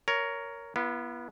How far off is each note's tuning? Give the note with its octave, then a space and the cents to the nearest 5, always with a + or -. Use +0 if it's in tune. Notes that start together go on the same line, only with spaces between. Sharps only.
A#4 +0 C#5 +15
B3 -25 E4 +40